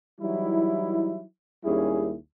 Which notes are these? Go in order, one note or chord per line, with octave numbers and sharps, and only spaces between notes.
E3 F#3 G3 D#4 E4
G#1 D#2 G3 C#4 E4 G#4